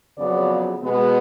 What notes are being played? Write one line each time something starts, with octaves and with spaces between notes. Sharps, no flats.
F2 C#3 F#3 B3 D5
B2 G#3 B3